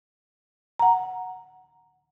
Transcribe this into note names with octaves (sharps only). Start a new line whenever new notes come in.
F#5 A#5